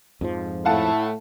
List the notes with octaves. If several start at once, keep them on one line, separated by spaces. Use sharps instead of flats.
F2 G#2 F3
A2 A3 E4 F5 F#5 A5